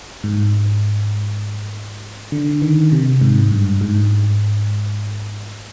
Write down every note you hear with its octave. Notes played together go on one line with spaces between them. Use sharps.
G#2
D3
D#3
C3
G#2
G2
G#2